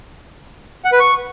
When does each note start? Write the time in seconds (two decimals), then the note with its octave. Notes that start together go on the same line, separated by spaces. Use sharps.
0.85 F#5
0.92 B4
1.00 C#6